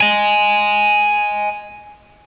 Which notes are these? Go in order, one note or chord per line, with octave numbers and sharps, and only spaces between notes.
D#5 G#5